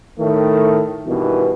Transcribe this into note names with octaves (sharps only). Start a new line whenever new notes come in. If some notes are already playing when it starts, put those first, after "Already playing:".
A2 D#3 A3
G2 B2 D#3 E3